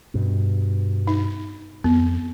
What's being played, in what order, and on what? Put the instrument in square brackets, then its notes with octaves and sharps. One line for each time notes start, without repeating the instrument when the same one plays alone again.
[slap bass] G2 B2
[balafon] D#4
[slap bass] F2 [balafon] B3